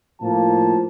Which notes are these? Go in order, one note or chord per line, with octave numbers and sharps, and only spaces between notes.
A2 F3 A#3 A5